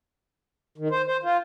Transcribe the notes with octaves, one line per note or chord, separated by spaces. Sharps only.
D#3
C5
C5
F4